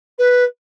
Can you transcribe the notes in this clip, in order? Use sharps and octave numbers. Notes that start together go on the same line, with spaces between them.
B4